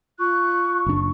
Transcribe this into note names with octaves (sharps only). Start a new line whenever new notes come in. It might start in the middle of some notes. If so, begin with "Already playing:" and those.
F4 C#6 F#6
F#1 D4